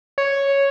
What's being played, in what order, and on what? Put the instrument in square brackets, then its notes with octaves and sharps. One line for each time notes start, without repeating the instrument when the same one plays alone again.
[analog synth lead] C#5